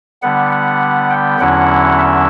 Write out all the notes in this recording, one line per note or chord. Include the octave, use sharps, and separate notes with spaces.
D3 G3 B3 F#5
F#5
G5
E2 D3 F#3 C#4 E4 F#5
E5